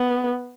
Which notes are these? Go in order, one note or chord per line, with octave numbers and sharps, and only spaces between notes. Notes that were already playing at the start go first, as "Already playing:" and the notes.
Already playing: B3